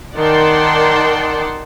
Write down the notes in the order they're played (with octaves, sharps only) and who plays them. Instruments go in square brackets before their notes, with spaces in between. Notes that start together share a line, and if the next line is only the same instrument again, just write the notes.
[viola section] D#3 D5 F#5 G5 A5 C6